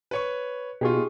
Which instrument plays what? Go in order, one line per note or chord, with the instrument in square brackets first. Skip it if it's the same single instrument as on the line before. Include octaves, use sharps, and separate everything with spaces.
[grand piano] B4 C#5 C#6
[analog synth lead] B2 [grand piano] D#4 F4 [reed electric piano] G4 G#4 C#6